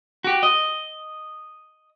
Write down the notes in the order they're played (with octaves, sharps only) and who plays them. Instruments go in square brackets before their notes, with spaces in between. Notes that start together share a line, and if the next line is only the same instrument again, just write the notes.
[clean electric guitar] F#4 G4
D#5